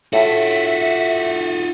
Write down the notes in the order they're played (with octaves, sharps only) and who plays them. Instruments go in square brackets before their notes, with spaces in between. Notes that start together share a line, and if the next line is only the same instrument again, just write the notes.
[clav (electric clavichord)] A2 [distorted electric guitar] F4 F#4 [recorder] E5